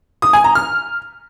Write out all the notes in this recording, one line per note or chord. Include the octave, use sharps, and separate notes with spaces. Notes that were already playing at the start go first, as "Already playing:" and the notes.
D#6
G#5
A#5
F6